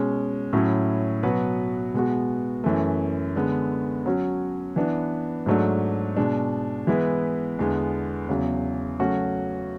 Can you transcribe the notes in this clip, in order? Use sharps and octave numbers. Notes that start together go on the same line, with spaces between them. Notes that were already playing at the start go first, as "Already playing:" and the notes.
Already playing: B2 G#3 C#4
A2 F#3 C#4 E4
B2 F#3 B3 F#4 B4
B2 G#3 B3 F#4
F#2 E3 A3
D3 G#3 B3
F#3 C#4 F#4
E3 B3 D4
G#2 F#3 A3 D4
B2 G#3 D4
E3 G#3 B3 E4 B4
E2 D3 G#3 B3
E2 C#3 F#3
C#3 F#3 A3 C#4 F#4